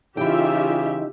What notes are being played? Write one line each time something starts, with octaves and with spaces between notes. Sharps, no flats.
C#3 E3 D#4 F4 G4 E5 G5